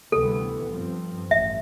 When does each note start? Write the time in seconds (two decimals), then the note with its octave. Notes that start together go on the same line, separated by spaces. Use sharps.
0.12 D2 C3 E3 G3 B3 A4
0.71 G2 F3 C4
1.31 A1 G2 E5